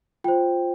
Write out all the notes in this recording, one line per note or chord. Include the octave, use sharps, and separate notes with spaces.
F4 C5 G5